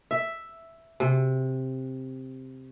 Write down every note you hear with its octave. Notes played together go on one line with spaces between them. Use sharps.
E5
C3